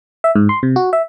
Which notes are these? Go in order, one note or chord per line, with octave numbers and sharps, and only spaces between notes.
E5
G#2
C6
C3
F#4
E5